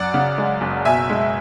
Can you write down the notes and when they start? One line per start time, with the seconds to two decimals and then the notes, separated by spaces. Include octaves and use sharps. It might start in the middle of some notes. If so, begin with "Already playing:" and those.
Already playing: F#2 D5 F#5
0.14 C#3
0.38 G#3
0.61 F#1
0.85 B2 E5 G#5
1.09 G#3